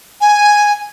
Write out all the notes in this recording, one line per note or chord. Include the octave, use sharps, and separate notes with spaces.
G#5